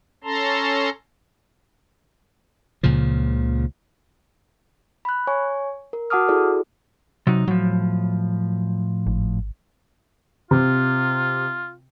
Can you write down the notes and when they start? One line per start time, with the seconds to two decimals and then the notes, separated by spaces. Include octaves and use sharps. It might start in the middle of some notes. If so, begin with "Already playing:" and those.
0.24 C#4 A4 A5 A#5 C6
2.83 C#2 A#2 C#3 F3
5.05 B5 F#6
5.27 C#5 G#5 C#6
5.93 A#4
6.10 F#4 F#5 A5 D6 D#6 F6
6.28 E4 F#4 G#4 A4 D5
7.27 C3 F#3 D#4
7.48 A2 F3 F#3
9.07 G#1
10.51 C3 F4